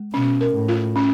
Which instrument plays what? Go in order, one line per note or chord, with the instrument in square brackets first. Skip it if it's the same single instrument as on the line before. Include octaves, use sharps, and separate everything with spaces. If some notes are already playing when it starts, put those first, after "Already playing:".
Already playing: [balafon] G#3
[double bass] B2 [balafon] C#4
[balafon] A#4
[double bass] A2
[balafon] F4
C#4